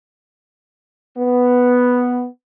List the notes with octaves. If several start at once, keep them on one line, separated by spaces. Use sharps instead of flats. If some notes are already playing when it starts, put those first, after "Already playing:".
B3